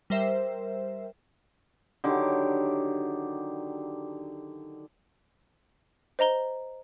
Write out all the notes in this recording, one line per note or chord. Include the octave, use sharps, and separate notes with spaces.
G3 A#4 C5 E5
D3 D#3 F#3 G4
C5 D#5 A#5 G7